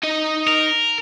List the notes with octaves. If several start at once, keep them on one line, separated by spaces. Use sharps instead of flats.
D#4 D#5
A#4